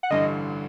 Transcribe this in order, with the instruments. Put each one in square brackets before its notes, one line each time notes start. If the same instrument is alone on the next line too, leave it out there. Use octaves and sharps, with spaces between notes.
[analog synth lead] F#5
[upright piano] A1 G2 D3 [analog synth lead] D#5